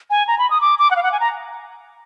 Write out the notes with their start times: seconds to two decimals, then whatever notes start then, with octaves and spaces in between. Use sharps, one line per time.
0.10 G#5
0.27 A#5
0.39 B5
0.50 D#6
0.61 D6
0.79 D6
0.91 F#5
0.96 F5
1.03 F#5
1.12 G#5
1.20 A#5